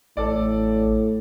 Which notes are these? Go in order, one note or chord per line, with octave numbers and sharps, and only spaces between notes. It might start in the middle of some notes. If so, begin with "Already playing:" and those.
A1 A2 A4 D5